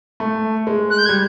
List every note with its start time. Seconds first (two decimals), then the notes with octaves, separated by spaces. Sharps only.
0.20 A3
0.67 G#3
0.90 F#6
0.98 G6
1.06 G#6
1.09 G3